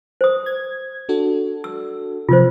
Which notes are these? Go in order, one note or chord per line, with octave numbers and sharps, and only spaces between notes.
C5 D#6
G#6
D4 F#4 A4
E6
C3 F3 F4 C5